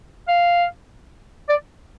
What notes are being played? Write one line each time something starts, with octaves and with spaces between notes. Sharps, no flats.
F5
D5